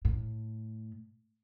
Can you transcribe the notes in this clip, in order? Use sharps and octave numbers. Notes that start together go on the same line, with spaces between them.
A2